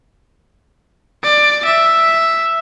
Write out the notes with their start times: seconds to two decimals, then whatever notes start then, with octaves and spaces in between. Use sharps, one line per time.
1.24 D5
1.65 E5